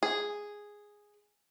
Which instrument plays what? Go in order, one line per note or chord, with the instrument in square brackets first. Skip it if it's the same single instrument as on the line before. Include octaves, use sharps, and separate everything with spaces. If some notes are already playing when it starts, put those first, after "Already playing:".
[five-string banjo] G#4